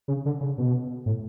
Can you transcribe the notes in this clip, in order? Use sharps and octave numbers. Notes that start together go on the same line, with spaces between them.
C#3
D3
C#3
B2
A2